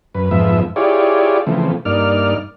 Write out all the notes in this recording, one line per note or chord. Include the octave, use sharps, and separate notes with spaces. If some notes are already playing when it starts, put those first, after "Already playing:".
F#2 B4
F2 G#2 F3 B3 E5
E4 F4 G4 G#4 C#5 D5
C#3 E3 F3 A3 C4
G2 A#3 D#4 D5 F6